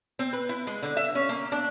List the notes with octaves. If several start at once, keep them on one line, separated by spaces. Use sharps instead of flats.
C4
B4
E4
G#3
D3
E5
C#4
A#3
D4